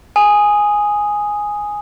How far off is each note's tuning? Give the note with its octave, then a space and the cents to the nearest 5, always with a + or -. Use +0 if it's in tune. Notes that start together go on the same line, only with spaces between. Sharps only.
G#5 +0 D#6 +0